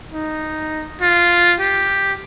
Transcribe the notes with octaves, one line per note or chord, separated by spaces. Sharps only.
D#4
F4
G4